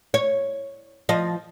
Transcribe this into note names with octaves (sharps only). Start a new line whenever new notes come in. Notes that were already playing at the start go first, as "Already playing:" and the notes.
C#5
F3 D#5